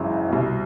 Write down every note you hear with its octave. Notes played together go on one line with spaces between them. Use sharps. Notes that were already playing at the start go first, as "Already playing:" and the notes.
Already playing: G#1 F#2 C#3 E3
C2 B2